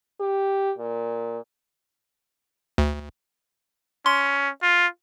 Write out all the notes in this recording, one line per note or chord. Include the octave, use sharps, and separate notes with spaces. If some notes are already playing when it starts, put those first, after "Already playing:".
G4
A#2
D2
C#4 C6
F4